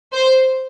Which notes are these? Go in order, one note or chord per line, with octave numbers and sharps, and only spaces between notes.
C5